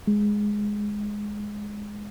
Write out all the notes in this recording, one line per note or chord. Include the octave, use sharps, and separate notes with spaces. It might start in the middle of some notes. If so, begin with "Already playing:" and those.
G#3